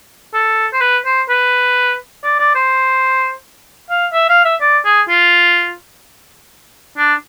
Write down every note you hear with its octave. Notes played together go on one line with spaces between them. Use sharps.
A4
C5
B4
C5
B4
D5
D5
C5
F5
E5
F5
E5
D5
G#4
F4
D4